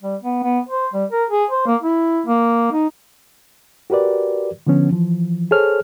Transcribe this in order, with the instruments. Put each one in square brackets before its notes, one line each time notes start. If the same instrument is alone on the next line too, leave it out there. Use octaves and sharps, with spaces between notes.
[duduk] G3
B3
B3
C5
G3
A#4
G#4
C5
A#3
E4
A#3
D#4
[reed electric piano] F#4 G4 A#4 B4 D5
D3 F3 B3 C#4
E3 F3
G#4 A4 C5 C#5 F6